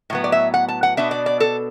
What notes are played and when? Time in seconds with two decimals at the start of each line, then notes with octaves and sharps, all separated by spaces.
0.10 A2 F#3 B3
0.24 D5
0.32 E5
0.54 F#5
0.68 A5
0.83 F#5
0.97 B2 B3 D4 E5
1.11 D5
1.26 D5
1.40 A4